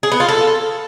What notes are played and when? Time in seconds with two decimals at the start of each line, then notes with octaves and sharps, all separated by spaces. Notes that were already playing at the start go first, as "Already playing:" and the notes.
0.03 G#4
0.12 B3
0.20 F4
0.29 A4